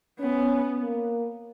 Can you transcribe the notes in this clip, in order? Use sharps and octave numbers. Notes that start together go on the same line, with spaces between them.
B3 C#4
A#3